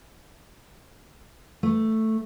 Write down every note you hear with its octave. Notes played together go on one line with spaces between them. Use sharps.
A3